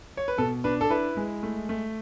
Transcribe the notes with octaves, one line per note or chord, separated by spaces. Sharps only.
C#5
B4
B2 A4
D4 B4
A4
E4 B4
G#3
A3
A3